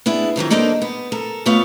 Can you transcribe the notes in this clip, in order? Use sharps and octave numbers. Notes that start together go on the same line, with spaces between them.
B3 D4 E4 G#4
F2 D#3 E3 F#3
A#3 D4 D#4 A4 A#4 C5
B3
A4 A#4
F2 A3 B3 F4 C#5 F5